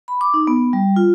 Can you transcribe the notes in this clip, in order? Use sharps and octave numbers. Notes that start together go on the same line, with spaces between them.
B5
D6
D#4
B3
G3
F4